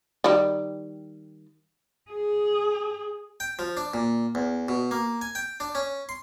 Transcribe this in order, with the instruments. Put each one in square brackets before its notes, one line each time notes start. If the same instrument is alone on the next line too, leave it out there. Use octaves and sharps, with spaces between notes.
[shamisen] D#3 G3
[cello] G#4
[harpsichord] G5
F3
D4
A#2
E2
B2
A#3
G#5
G5
D4
C#4
C6